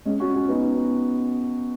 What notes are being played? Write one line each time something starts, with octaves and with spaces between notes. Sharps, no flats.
G#3 C#4
C#4 F#4
C#4 F#4
B3 D#4